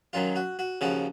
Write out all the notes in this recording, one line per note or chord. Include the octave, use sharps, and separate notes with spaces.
F#2 D#3 F#3 F4
F#4
F#4
D#2 C#3 F3 F#4